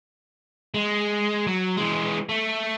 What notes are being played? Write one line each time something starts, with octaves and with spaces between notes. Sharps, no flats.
G#3
F#3
E3 G#3
A3